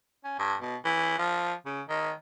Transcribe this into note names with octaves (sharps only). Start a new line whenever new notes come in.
C#4
G2
B2
E3
F3
C#3
D#3